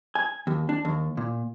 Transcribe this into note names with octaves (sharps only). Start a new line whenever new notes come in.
G#5
D#2
D4
D#2
A#2